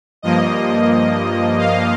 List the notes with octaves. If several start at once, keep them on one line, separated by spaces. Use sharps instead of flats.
G2 F3 A#3 D#5
F5